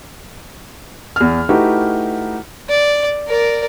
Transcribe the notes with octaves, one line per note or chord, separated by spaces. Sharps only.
E2 F6
A3 D#4 E4 F#4 G4 B4
D5
A#4 D5